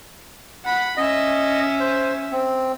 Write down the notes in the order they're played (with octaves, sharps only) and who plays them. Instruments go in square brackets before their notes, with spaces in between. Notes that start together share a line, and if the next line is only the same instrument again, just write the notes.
[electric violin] F#5 B5
[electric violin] C#4 E5 [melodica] D#5
[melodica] C5
C4